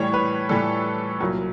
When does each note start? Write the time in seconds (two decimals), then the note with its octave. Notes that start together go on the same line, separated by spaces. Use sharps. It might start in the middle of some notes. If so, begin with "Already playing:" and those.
Already playing: A2 E3 G3 C#5
0.14 B4
0.49 A2 E3 G3 A4
1.21 C2 A#2 F#3